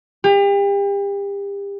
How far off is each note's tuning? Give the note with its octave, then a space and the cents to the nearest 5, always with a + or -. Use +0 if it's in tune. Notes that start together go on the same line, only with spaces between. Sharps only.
G4 +35